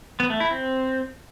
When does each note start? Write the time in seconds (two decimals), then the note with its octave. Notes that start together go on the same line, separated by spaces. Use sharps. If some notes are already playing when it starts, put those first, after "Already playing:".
0.20 B3
0.30 A3
0.40 E4
0.51 C4